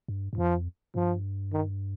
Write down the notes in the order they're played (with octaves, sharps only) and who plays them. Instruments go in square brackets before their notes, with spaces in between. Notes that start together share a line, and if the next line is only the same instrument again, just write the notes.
[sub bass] G2
G2
[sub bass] F2 [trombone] F3
[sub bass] G2 [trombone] F3
[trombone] D#3